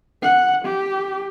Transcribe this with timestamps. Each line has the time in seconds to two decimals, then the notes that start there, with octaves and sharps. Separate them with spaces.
0.23 F#5
0.66 G4